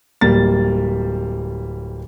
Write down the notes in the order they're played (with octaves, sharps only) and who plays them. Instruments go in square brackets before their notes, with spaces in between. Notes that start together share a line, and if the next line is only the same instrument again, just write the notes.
[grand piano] D1 G3 A#3 A6